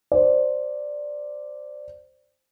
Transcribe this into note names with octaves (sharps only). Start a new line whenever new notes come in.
C5 D5